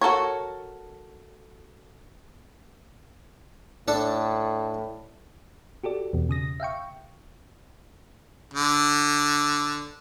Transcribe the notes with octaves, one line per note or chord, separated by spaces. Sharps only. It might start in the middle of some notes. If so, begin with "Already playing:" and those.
F#4 A4 A#4 C#5
A2 D4 A4
F#4 G4 A4 D5
E2 B2
C#3 D#6 A#6
E5 F5 G5 C#6
D3